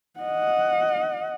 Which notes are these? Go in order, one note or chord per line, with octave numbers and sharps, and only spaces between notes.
D#5 F#5